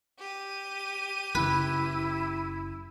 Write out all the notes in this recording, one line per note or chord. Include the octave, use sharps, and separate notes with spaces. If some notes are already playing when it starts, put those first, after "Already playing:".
G4 D#7
F#1 E4 B4